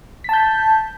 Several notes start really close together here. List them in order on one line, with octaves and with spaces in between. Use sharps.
B6 A5 G6